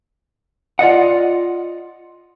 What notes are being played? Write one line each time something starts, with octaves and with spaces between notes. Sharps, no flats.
F4 D5 D#5 F#5